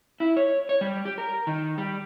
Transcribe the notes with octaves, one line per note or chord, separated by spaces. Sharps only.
E4
C#5
C#5
G3
G4
A#4
D#3
G3